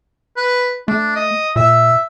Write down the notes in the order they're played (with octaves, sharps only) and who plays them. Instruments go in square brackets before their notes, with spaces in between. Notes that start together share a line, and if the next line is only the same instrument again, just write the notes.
[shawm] B4
[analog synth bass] A3 [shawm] D4
[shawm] D#5
[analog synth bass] A#2 [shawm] E5